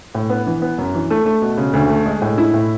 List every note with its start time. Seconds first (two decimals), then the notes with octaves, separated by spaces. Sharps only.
0.15 A2
0.30 B3
0.47 E3
0.62 B3
0.78 F#2
0.94 E3
1.10 A3
1.26 A3
1.42 B2
1.57 C#3
1.73 D2
1.89 A3
2.06 G#3
2.22 A2
2.38 E4
2.54 A2